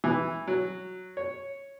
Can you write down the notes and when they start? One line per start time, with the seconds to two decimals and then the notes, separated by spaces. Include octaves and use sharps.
0.04 E3
0.47 F#3
1.17 C#5